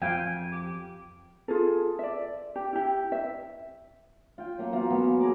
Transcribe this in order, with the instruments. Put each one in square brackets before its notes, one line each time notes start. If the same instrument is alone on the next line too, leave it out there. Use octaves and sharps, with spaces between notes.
[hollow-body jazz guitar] F2 [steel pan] F5 G5 [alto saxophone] G#5
[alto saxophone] G4
[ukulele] F4 G#4 A4
D5 E5
G4
E4 G4
E5
[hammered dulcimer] F4 G5
F#3 A#3 C#4
A#3 B3 F4 F#4
F#3 A#3 B3 C#4
A#3
G#4 A#4 B5 D6